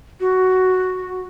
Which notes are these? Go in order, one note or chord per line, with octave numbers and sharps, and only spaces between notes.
F#4